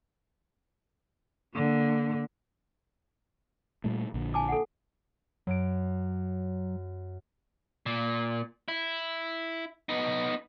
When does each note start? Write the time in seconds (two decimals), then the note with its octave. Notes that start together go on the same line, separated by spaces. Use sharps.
1.53 D3 A#3
3.84 A#2 G3 A3
4.14 A#1 D3
4.34 G#5 A5 D6
4.49 A4 F#5
5.47 F#2 F#3 D7
7.86 A#2
8.68 E4
9.89 B3 D#4